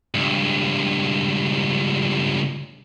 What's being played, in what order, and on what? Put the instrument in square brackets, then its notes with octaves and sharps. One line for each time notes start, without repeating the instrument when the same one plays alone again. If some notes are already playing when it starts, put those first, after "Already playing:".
[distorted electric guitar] C#2 G2